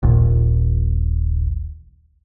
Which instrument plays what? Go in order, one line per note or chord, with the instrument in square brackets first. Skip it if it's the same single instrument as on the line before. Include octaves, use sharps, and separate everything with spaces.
[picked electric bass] D#1 A#1